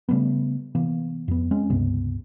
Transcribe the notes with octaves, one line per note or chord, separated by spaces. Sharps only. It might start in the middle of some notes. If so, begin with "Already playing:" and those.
C#3 G3 A3 B3
C3 E3 A#3 B3
F2 B3
G#3 C4 C#4
C#2 G2 C3 B3